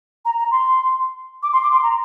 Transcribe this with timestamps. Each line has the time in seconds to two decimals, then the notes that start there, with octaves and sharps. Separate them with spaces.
0.25 A#5
0.38 A#5
0.51 C6
1.42 D6
1.53 C6
1.63 D6
1.72 C6
1.82 A#5